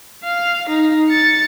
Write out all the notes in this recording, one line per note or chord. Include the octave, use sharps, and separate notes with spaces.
F5
D#4
A6 C#7